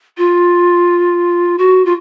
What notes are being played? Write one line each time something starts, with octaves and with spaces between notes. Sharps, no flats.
F4
F#4
F4